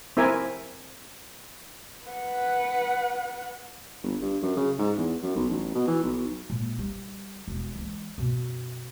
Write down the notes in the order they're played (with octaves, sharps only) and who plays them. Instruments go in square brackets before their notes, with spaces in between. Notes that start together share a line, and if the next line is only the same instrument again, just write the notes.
[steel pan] C4 E4 A#4 E5 G#5
[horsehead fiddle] B4 F#5
[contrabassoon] G1
G2
F#2
C#3
G#2
E2
F#2
B1
A1
B2
E3
B1
[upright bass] A#2 G#3
G3
E1
E3 G#3
F#2 B2